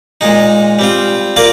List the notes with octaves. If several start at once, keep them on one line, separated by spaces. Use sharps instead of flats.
A#2 G#3 D#4
G3 C4 F4
A#3 F4 A#4 D5 F5